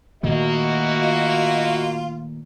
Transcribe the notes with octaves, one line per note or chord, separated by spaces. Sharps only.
A#2 D#3 A3 A#3 E4 F#4 D#5
F4